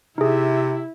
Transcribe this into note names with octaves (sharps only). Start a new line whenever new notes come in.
C3 D#4 E4 G#4